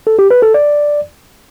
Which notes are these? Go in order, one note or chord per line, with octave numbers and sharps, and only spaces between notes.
A4
G4
B4
A4
D5